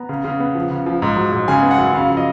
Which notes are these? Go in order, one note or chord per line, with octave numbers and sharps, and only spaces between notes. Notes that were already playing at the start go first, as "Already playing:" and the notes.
Already playing: B3 A#5
C#3
C#3
B3
F3
C#3
F3
G#2
F#3
G#2
C#3 G#5
B3
F#5
F#2
C#3 F5
F3
D#5